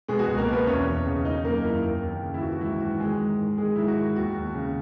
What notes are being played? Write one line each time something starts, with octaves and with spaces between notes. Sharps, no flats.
B2 G#3 G#4
F#4
C#2 G#3 G#4
A#3 A#4
B2 B3 B4
E2 C#4 C#5
E2
C#3
D#3 D#4 D#5
F#2 A#3 A#4
D#3 E4
D#2
D#2
C#3
E4
E3 F#4
F#4
G#2 E4
E3 F#4
D#3 G#3 G#4
G#2
D#3
D#3 G#3 G#4
G#2 E4
F#4
D#3
D#2 F#4
D#2
C#3